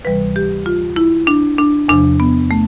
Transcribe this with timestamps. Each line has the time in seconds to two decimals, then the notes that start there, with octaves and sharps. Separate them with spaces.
0.04 D2 C3 E3 G3 B4
0.36 G4
0.66 F4
0.96 E4
1.27 D4
1.58 D4
1.88 E2 C3 F3 D4
2.20 B3
2.51 A3